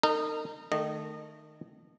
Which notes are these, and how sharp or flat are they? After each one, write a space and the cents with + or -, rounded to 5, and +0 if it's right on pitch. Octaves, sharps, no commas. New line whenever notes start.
D#4 -20 A#4 -40
D#3 -25 A3 +0 D#5 -25